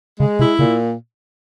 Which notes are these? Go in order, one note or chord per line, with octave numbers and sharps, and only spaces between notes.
C#3 G#3
C3 E4
A#2 C#3